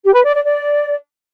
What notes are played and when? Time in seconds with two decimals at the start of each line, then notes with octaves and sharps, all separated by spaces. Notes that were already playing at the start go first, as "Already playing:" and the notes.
0.04 G4
0.14 B4
0.25 D5
0.35 D5
0.45 D5